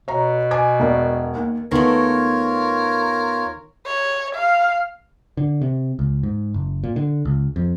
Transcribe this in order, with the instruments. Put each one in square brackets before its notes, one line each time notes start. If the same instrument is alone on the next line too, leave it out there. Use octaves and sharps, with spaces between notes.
[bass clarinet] B2 [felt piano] C#5 A#5
[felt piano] G#5 D6 G#6
E1 A#4 D5
D#2
[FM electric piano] D#2 B3 [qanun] D#3 A3 [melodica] F4 C#5 [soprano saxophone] A#4
[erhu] C#5
F5
[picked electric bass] D3
C3
C#2
G#2
F#1
A#2
D3
C#2
F2